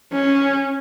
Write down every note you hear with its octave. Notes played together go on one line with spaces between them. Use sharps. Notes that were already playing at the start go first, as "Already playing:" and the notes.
C#4